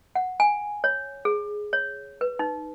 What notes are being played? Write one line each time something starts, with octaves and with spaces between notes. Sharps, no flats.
F#5
G#5
C#5
G#4
C#5
B4
D#4